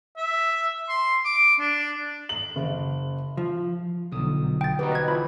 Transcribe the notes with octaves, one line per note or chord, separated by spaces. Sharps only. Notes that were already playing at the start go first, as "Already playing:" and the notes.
E5
C6
D6
D4
F#7
F#1
F3
B1 D3 F3 D#6
G5 A6
D#4 F#4 G4 B4 C5
D#5 G#6
E3 F3 B5